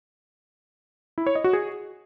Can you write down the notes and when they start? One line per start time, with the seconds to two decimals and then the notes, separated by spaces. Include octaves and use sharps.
1.18 E4
1.27 C#5
1.35 D#5
1.44 F#4
1.53 G#4